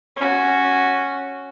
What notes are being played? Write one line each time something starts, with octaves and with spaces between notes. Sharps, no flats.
C#4 F#4